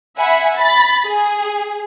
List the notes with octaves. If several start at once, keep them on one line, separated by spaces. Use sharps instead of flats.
E5 F#5 G#5 B5
B5 A6
G#4